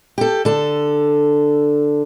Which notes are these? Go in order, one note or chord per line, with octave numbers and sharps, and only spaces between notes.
G4 A4
D3 A4